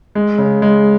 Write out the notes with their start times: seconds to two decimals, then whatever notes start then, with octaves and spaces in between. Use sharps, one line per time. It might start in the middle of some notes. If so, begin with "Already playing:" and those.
0.15 G#3
0.38 C#3
0.62 G#3